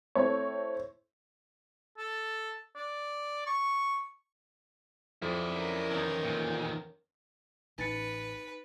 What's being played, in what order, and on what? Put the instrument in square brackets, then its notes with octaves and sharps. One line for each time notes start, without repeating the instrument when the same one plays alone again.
[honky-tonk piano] A3 C4 E4 C#5
[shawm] A4
D5
C#6
[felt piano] F2 [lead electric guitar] E4 D5
[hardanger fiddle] C#4 A#4
[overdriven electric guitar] E2 D#3
[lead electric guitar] A#2
[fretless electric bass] A1 [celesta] D#4 A6 C#7 [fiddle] B4